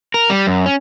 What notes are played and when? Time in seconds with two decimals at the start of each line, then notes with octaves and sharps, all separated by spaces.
0.14 A#4
0.30 G3
0.47 F#2
0.66 C#4